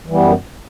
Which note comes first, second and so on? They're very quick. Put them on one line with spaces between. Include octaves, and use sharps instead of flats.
E3 G3 B3 F#2